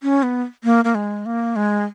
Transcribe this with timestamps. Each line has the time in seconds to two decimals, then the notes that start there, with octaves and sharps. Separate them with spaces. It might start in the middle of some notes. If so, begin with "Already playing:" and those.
0.03 C#4
0.23 B3
0.64 A#3
0.85 A#3
0.95 G#3
1.26 A#3
1.56 G#3